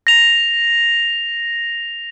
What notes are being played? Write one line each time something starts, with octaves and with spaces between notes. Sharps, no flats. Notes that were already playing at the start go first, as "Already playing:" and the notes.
A#6 F7